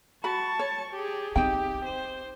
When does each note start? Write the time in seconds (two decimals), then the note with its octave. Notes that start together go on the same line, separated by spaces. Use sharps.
0.24 F#4 A5 B5 C#6
0.59 C#5
0.94 G4 G#4
1.36 C4 D#4 G4 G5
1.85 C5